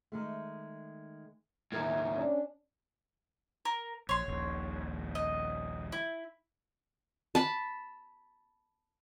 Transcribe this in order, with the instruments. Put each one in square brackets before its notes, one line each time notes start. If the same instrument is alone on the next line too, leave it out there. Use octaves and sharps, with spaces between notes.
[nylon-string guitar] D#3 G#3 A3
[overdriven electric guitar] D#2 A2 [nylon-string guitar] D#3 E4 A#4
[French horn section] C#4 D4
[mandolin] A#4
[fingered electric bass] A#1 [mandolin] C#5 C6
[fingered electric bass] D#1 A#1 D#2
[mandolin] D#5
E4
[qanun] A5 B5